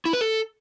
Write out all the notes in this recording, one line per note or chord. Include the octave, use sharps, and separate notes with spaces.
E4
B4
A4